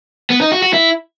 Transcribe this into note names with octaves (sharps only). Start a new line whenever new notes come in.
B3
D#4
F#4
F#4
E4